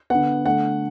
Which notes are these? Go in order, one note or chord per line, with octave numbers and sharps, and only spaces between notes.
D3 B3 F#5
D3 A3 F#5